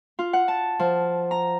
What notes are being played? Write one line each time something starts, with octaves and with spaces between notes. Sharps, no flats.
F4
F#5
A5
F3
A#5